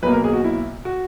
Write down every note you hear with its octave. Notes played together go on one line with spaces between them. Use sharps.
B1 B2 A#3 B4
A#4
G#4
F#4
E4
F#4